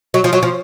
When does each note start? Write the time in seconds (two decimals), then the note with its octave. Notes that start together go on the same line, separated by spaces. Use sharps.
0.14 F#3
0.24 F3
0.33 F#3
0.43 F3